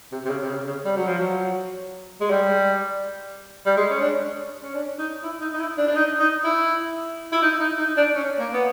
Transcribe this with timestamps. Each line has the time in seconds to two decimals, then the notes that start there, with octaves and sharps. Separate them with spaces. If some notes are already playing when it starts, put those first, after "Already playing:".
0.12 C3
0.25 C3
0.30 C#3
0.41 C3
0.48 C#3
0.67 C#3
0.85 G3
0.96 F#3
1.07 F3
1.18 F#3
2.21 G#3
2.30 G3
3.66 G3
3.77 G#3
3.90 C#4
4.01 D4
4.63 C#4
4.74 D4
4.99 D#4
5.23 E4
5.41 D#4
5.54 D#4
5.60 E4
5.77 D4
5.87 D4
5.95 D#4
6.20 D#4
6.44 E4
7.32 E4
7.42 D#4
7.60 D#4
7.79 D#4
7.97 D4
8.15 C#4
8.39 A#3
8.53 B3